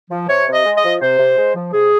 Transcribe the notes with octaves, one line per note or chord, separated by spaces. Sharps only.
F3
C3 C#5
C3
D#5
G#3
D#5
F3
C3 C5
C3
G#3
F3
C3 G#4